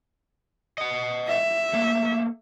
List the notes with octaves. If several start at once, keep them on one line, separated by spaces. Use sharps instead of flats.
D#5 F#5
E5
A3 A#3